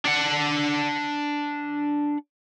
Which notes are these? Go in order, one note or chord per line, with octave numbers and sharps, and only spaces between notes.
D4 F#5